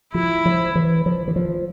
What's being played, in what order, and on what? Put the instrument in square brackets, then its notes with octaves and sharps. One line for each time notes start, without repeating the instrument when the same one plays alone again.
[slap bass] F3 [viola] E4
[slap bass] F3
E3
F3
E3
F3